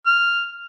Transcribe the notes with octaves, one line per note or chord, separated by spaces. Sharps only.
F6